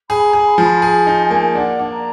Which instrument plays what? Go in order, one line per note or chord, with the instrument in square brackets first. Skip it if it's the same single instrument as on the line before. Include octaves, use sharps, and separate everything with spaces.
[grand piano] G#4 [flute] B5
[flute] A#5
[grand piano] G#4
[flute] B5
[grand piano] F3
[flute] B5
[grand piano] G#4 [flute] A#5
[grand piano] D#4
[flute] G#5
[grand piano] A#3
[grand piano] D4 [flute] F#5
[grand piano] D4
[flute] A#5